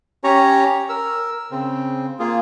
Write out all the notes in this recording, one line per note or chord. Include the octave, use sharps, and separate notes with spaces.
C#4 G4 C#5 A#5
A#4 E6
C#3 C4
A#3 F4 G#4